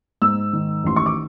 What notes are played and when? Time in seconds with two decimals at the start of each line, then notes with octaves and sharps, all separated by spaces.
0.22 G#2 E6
0.53 D#3
0.84 A1 C6
0.96 C#6
1.06 D6